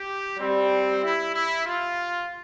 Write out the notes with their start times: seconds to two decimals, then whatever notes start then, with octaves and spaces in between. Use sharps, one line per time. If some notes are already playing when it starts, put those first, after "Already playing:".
Already playing: G4
0.38 G3 C4
1.01 E4
1.33 E4
1.65 F4